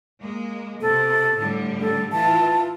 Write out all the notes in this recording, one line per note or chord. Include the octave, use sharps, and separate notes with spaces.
G#3 A#3
C3 A4
A2 D3 G3
A4
E3 F4 A5